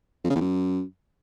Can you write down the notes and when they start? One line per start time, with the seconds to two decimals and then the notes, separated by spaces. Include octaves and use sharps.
0.24 F2
0.30 C#3
0.35 E2
0.41 F#2